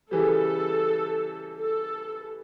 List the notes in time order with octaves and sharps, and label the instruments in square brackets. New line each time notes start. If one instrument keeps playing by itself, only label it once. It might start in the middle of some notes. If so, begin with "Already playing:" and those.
[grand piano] C#3 E3 G3 [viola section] A4
[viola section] A4